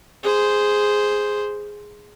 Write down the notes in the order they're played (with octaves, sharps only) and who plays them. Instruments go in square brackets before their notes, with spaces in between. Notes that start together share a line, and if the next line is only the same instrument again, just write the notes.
[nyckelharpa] G#4 C5